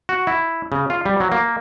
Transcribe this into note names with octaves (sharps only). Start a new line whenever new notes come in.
F#4
E4
C#3
F4
G3
F#3
A#3